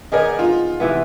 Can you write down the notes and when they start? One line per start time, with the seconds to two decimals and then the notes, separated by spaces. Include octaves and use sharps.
0.12 D#3 B3 G#4 A#4 D5 D#5
0.39 F4
0.80 C3 E3 B3